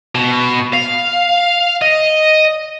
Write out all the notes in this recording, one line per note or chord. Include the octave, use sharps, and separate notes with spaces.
B2
F5
D#5